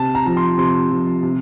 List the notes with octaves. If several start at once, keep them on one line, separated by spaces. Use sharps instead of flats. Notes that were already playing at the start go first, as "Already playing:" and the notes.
Already playing: C3 A5
A#5
F3 A#5
C6
C3 C6
F3
C3